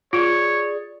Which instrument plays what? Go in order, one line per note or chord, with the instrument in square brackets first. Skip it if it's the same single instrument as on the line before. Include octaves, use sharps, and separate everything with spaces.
[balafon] F4 [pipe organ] G#4 D5 [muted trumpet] C#5